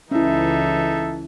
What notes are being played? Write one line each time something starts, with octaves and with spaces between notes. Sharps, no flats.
C#2 E3 C#4 D#4 E4 A4 E5